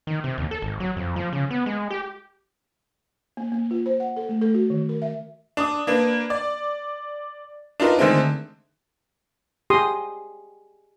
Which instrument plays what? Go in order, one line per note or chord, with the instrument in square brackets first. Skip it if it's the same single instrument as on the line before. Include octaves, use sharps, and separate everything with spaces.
[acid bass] D#3
C3
D#2
A4
G#1
F#3
F2
F3
C#3
B3
G#3
G4
[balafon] A#3
A#3
F4
C5
F#5
A4
A3
A4
F#4
D#3
A#4
E5
[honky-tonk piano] D4 D6 D#6
A#3 D4 B4
D5
D4 D#4 F4 A#4 B4
D3 D#3 G#3 A3 C4
[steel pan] G4 G#4 C6 D#6